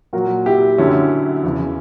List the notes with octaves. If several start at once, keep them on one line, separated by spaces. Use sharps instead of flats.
A#2 F#3 F#4 A#4
E4 G4
F#2 D3 F#3 C#4 E4
E2 C#3 E3